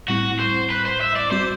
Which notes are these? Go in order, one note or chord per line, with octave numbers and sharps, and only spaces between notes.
A2 G3 C4 E4 F#4
C5
B4
C5
E5
D5
G3 C4 F#4 C5